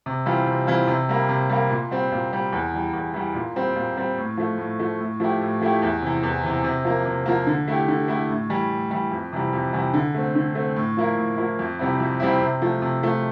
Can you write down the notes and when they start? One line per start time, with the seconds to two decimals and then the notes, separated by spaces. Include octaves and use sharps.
0.06 C3
0.26 E3 G3 C4 F4
0.47 C3
0.67 E3 G3 C4 F4
0.88 C3
1.09 G3 A#3
1.29 C3
1.49 G3 A#3
1.70 A#2
1.91 G3 C4
2.12 A#2
2.32 G3 C4
2.52 E2
2.73 E3 G3
2.93 E2
3.14 E3 G3
3.35 A#2
3.56 G3 C4
3.76 A#2
3.97 G3 C4
4.18 A2
4.37 F3 A3
4.58 A2
4.79 F3 A3
5.00 A2
5.20 F3 A3 E4 G4
5.41 A2
5.61 F3 A3 E4 G4
5.82 E2
6.02 C3 E3
6.23 E2
6.43 C3 E3
6.64 C3
6.84 F3 A#3
7.06 C3
7.26 F3 A#3
7.47 D3
7.68 A3 E4 G4
7.88 D3
8.08 A3 E4 G4
8.30 A2
8.50 E3 G3
8.70 A2
8.91 E3 G3
9.11 F2
9.33 C3 E3 G3
9.53 F2
9.73 C3 E3 G3
9.94 D3
10.14 A3 C4
10.35 D3
10.55 A3 C4
10.76 A2
10.97 F3 A#3 E4
11.18 A2
11.38 F3 A#3 E4
11.59 F2
11.79 C3 G3 C4 E4
12.00 F2
12.20 C3 G3 C4 E4
12.41 C3
12.62 F3 A3
12.82 C3
13.03 F3 A3